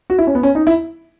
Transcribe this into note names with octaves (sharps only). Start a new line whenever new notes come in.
F#4
E4
C#4
B3
C#4
D#4
E4